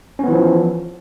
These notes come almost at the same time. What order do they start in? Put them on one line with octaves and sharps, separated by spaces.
C#4 B3 E3 F3